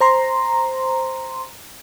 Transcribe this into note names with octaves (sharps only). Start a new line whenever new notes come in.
C5 A#5 C6